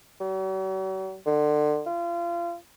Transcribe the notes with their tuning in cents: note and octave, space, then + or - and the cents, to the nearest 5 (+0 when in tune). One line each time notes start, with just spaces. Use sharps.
F#3 +45
D3 +30
F4 -30